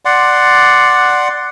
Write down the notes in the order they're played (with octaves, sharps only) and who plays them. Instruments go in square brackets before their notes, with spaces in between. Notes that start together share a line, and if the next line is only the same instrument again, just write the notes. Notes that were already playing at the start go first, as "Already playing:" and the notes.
[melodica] D5 F#5 C6